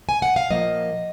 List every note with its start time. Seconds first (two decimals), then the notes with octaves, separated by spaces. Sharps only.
0.09 G#5
0.22 F#5
0.36 F5
0.50 A#2 F3 A#3 D#5